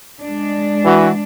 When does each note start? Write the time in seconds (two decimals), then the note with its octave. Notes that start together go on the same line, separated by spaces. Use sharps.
0.22 G#3 D4
0.85 E3 F#4